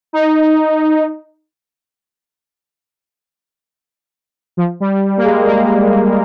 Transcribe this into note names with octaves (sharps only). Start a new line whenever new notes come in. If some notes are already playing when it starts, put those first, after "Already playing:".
D#4
F3
G3
A#3
G#3
A#3